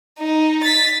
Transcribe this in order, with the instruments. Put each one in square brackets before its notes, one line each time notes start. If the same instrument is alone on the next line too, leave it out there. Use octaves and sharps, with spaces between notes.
[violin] D#4
A6 B6